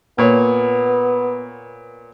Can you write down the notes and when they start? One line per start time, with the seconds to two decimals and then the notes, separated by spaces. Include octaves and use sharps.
0.18 A#2 B3 C#5